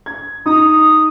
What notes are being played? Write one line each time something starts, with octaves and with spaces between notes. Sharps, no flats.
G#6
D#4 D#6